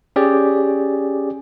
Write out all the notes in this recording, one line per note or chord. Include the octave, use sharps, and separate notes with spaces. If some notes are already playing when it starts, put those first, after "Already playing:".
C#4 G4 G#4 D5